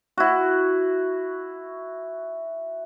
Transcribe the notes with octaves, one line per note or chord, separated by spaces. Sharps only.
E4 F#4